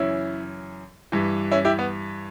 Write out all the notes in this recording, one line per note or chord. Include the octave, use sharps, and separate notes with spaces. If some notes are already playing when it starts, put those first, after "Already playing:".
Already playing: F#2 C#3 E3 C#4 E4
G2 E3
C#4 E4
E4 G4
B3